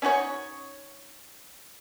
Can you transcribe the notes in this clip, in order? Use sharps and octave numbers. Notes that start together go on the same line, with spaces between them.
C#4 D#4 F#4 C#5